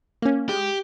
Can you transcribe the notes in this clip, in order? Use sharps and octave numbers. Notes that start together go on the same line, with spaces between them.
A#3 C#4
G#3 G4